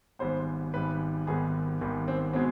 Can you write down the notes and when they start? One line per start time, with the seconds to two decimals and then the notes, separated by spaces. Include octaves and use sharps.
0.19 G#1 G#2 G3 B3 C5
0.74 G#1 G#2 G3 B3 B4
1.26 G#1 G#2 D#3 G3 B3 G#4
1.81 G#1 G#2 D#3 G3 B3
2.08 C4
2.33 B2 G#3 B3 C4